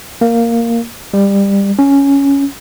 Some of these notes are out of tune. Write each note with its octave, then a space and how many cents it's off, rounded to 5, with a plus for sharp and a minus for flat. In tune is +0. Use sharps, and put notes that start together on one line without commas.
A#3 -5
G3 +20
C#4 +5